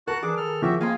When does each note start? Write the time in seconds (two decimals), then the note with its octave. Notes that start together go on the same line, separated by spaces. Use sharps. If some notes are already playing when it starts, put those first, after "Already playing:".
0.07 F#4 A#4 F#5 A5 F#6
0.23 E3 D4 G#4 D6
0.37 D#3 A4 F6
0.62 F3 F#4 G4 E5
0.81 A#3 D#5 F5 G5 G#5 C6